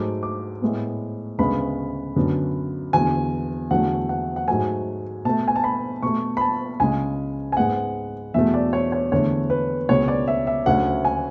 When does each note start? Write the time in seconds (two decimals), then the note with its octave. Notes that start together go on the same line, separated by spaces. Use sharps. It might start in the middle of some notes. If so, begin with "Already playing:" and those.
Already playing: G#2 F#3 A3 D6
0.23 D6
0.62 A2 G#3 B3
1.39 D2 C#3 G#3 B3 B5
2.16 F#2 D3 F#3 B3
2.93 E2 D3 F#3 G#5
3.71 E2 D3 F#3 A3 F#5
4.09 F#5
4.36 F#5
4.48 G#2 F#3 A3 G#5
5.25 B2 A3 A5
5.48 G#5
5.56 A5
5.64 B5
6.03 B2 A3 C#6
6.37 B5
6.41 A5
6.80 C#2 C#3 G#3 G#5
7.52 G#5
7.57 G#2 G#3 B3 F#5
8.34 E2 B2 F#3 A3 E5
8.54 D5
8.73 C#5
8.92 C#5
9.12 E2 D3 A3 C#5
9.50 B4
9.89 C#2 B2 G#3 B3 C#5
10.08 D5
10.28 E5
10.47 E5
10.66 D2 C#3 F#3 A3 F#5
11.05 G#5